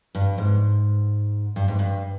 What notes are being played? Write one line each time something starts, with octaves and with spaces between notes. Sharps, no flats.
G2
G#2
G2
G#2
G2